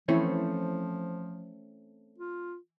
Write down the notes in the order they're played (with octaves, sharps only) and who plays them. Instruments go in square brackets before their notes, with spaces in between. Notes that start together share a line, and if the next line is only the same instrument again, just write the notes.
[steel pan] E3 E4 C#5 [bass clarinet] F3 [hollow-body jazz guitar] A3 C4 C#4
[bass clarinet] F4